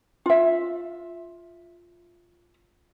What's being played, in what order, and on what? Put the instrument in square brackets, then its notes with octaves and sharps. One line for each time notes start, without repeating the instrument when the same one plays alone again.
[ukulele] F4 E5